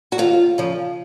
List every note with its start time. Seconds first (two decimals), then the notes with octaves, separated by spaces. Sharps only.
0.12 F#4
0.18 D#2 F4
0.58 C#3 F3